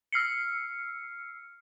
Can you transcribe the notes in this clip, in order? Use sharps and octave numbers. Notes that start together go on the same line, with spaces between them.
E6 F6 C7 C#7